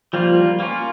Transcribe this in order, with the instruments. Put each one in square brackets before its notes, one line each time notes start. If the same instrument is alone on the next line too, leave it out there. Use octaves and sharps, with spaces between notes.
[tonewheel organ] F3 [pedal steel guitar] G3 A#3 F4
[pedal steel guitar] A#3 C#4 F4